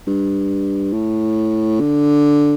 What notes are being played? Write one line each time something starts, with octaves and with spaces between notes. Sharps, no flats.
G2
A2
D3